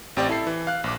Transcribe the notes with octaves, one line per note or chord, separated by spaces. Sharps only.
A1 C4 G4 D5
E4 A4 C7
E3
F5 F#6
A#1 D6